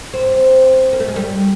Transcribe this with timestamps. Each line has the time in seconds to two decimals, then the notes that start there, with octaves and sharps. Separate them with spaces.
0.14 C4
0.93 A#3
1.00 A3
1.08 G#3
1.16 G3